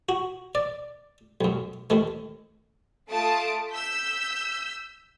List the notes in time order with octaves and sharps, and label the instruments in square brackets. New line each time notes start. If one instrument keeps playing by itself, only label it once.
[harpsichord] F#4
D5
B1 F#2
D#2 D#3 A3
[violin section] A3 F4 A5 D#6 D7
E6 G6 B6